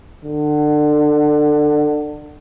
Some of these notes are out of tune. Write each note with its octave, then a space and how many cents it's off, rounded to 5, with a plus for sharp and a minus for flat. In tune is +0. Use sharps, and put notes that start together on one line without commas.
D3 +25